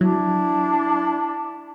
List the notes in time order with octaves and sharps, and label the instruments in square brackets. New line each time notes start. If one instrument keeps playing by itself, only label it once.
[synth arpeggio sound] F#3 [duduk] D4 [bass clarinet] E4